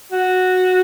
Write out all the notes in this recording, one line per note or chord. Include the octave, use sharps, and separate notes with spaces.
F#4